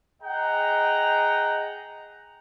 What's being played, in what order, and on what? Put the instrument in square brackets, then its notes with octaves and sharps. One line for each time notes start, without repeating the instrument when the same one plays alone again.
[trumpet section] G#4 D#5 F#5 G5 A#5